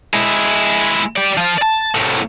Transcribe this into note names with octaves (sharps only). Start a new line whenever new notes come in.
G#3 E4
G4 D5
F3 F4
D5 A5
C2 A2